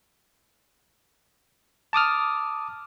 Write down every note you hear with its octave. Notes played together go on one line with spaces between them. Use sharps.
A5 D6 D#6 F6